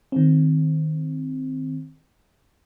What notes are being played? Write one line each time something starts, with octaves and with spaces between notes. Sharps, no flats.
D#3 C4